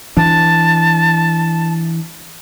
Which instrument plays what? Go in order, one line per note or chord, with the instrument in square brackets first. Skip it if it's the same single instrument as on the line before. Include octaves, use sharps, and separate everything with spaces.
[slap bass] E3 D4 [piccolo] A5